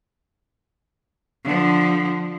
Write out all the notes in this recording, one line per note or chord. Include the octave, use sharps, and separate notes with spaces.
D3 F3